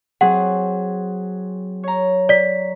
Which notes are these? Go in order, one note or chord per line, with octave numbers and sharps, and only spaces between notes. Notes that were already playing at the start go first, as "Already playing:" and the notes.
F#3 C4 G#4 F#5
C#5 A#5
D5 B6